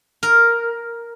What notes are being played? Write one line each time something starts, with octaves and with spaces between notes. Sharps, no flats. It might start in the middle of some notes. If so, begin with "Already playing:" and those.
A#4